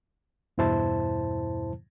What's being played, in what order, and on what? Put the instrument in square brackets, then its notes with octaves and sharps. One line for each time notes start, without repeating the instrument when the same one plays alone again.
[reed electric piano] E2 G2 B2 E4 C5 A5